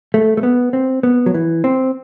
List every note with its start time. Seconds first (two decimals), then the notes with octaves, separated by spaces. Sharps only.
0.14 A3
0.37 A3
0.43 B3
0.73 C4
1.03 B3
1.26 F#3
1.34 E3
1.64 C4